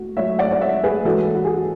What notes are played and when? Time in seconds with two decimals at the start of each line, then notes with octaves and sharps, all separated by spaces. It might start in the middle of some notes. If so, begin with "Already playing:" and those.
Already playing: A2 F#4
0.17 A2 F#3 C#5 E5
0.39 D5 F#5
0.52 D5
0.61 C#5 E5
0.84 G#4 B4
1.05 E3 F#4 A4
1.10 G#2
1.35 F#4
1.45 G#4
1.54 F#4